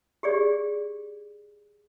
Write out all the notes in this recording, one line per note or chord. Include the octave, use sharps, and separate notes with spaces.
G4 G#4 D5